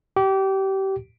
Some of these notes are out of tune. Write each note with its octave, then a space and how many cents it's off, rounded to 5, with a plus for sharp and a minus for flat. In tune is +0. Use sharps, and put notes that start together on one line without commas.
G4 -25